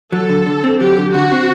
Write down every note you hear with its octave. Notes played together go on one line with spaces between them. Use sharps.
F#3 A4
D3
D3
C4
F#3 G4
D3
D3 F#4
C4